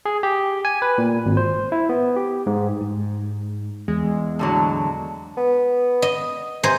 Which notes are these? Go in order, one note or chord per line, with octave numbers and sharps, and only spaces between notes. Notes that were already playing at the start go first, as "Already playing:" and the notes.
G#4
G4
G#5
B4
A#2
G#1
C5
E4
B3
G4
G#2
G#2
E2 G#3
A2 D3 F#3
B3
D#5
C3 C5 G#5 A#5